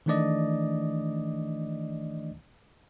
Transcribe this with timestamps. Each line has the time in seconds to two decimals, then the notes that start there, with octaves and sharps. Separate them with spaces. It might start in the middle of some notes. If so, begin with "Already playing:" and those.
0.06 D#3 E3 A3 D4 D5 D#5